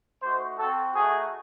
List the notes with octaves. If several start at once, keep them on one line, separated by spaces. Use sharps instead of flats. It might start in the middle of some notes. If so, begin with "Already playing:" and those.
A3 D#4 F#4 C5
C4 F#4 A4
A3 D#4 F#4 G#4